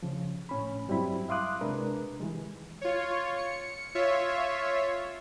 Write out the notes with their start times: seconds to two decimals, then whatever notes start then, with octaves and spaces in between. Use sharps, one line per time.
0.03 C#3 F3
0.49 A2 C#4 B5
0.88 G2 F#3 G3 C4 E4 B5
1.29 E5 F5 C6 D6 D#6 F#6
1.61 C3 G#3 D4 A#4 B4
2.20 D#3 E3 G3 G#3
2.81 F4 C#5
3.37 C#7
3.95 F4 C#5 E5